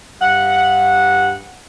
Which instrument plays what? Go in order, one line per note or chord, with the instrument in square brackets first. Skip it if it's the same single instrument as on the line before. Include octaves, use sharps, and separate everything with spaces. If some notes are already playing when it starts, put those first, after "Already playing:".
[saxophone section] G2 F#5